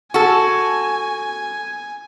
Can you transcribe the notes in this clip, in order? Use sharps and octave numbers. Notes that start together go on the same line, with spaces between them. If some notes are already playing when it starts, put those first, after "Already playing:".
F#4 A4 G#5